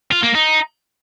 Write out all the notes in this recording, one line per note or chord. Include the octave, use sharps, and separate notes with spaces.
F4
A#3
D#4